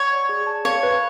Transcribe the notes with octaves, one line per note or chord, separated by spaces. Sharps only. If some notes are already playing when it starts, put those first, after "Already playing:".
Already playing: C#5 F#5
D5
G#4
A5
C#5 F5
B4